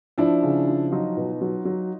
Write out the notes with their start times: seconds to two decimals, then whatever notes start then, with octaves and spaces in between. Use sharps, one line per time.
0.18 F3 D4 E4
0.43 C#3
0.68 F3
0.92 F#3 D#4 F4
1.17 B2
1.41 F#3
1.65 F#3